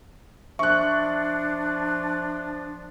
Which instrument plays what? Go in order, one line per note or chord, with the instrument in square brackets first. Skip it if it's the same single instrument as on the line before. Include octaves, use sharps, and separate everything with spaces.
[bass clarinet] F3 [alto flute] D4 [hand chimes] E5 [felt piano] C#6 F#6